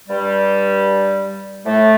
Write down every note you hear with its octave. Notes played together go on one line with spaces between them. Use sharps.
G2 G3
A2 A3